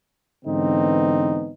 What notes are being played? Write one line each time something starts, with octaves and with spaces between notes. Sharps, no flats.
G#2 D3 E3 B3 C4 D#4